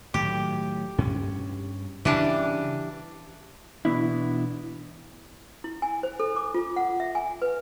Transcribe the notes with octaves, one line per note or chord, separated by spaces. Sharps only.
A2 D#3 F#3 G4
G2 C#4
C#3 E3 G3 D4
B2 E3 B3 D4 E4
E4
G#5
C5
A4
D6
F4
F#5
E5
G#5
B4